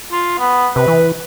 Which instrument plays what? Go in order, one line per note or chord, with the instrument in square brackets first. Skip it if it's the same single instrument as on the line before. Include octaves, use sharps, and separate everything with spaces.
[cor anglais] F4
B3
[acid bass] C3 [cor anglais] B4
[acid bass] E3